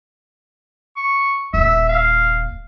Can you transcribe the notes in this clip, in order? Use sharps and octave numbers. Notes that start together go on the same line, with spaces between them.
C#6
D#1 E5
F5